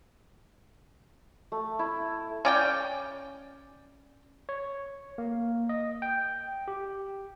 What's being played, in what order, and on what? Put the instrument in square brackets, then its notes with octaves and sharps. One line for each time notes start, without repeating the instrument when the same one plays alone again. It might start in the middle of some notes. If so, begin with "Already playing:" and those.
[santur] A3
E4
[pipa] C#4 D5 G5
[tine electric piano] C#5
A#3
D#5
G5
G4